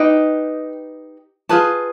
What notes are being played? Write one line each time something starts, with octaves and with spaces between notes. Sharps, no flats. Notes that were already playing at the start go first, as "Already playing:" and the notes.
Already playing: D#4 G4 B4 G5
F4 G#4 B4 A5